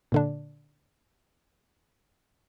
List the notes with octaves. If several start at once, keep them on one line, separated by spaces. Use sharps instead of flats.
A#2 D3 D4